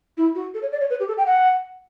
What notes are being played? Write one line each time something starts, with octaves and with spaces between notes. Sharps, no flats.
E4
F#4
A4
C#5
D5
C#5
B4
G4
A4
G5
F#5